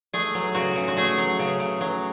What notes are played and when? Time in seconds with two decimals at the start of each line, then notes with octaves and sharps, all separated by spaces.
0.14 A3 G#4
0.35 F#3
0.55 C#3 F#4
0.76 C#3
0.88 F#4
0.97 A3 G#4
1.18 F#3
1.39 C#3
1.60 C#3
1.81 F#3